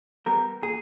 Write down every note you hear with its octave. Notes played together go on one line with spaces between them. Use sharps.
G3 B3 A#4
A#2 G#4